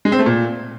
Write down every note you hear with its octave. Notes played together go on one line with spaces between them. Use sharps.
G#3
C4
A3
A#2